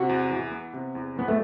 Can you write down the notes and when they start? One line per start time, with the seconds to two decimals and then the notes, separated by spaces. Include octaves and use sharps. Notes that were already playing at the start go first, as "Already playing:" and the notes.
Already playing: C3 F#4
0.09 E2
0.30 E3
0.52 B3
0.73 C3
0.95 E2
1.16 E3 B3
1.28 A3